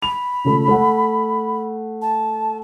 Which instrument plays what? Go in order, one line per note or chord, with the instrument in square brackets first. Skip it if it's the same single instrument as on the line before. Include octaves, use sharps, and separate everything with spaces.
[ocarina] B5 [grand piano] F7
[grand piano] C#3 F3 A3
A3 F#5
[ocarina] A5